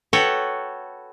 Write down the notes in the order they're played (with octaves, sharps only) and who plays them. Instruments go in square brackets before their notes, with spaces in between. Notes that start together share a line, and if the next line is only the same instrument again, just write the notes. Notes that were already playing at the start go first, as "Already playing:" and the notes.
[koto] F#4 A4 B4 C#5 F#5 G5